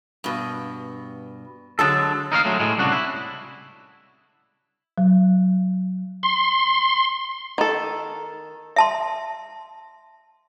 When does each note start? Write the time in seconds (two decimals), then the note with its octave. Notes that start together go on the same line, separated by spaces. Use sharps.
0.24 G2 B2
1.79 D3 F#3 G#3 A4 A5
2.32 D#4 A#4 C#5 F5
2.45 F#3 G#3 A3
2.60 A2 G#3
2.78 C2 C#3 D4 F#4
2.92 E4
4.98 F#3
6.23 C6
7.58 D#3 A4
8.76 E5 A5 C6